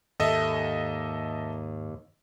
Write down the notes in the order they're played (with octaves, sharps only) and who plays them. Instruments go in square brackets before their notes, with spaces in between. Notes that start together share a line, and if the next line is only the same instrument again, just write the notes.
[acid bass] D#2 [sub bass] G#2 [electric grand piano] A4 D#5 E5